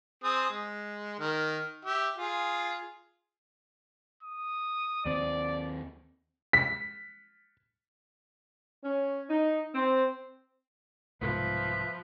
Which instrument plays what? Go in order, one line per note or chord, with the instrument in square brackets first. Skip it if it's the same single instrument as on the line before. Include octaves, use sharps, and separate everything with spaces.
[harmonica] C4 G#4 D#6
G#3
D#3 A#4
G4 E5
F4 G#4
[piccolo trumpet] D#6
[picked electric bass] D#2 C4 [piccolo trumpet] D5
[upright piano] B6
[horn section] C#4
D#4
C4
[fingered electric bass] C2 G#2 B2 [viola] F3 [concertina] B4 E5